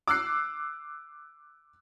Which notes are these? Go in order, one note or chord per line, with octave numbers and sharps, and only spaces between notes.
D6 E6 F#6 C7